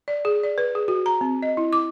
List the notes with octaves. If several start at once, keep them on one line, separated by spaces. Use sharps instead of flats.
D5
G#4
D5
B4
G#4
F#4
A#5
C4
D#5
E4
D6